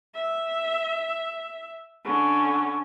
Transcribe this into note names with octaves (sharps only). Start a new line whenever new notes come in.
E5
D3 C#4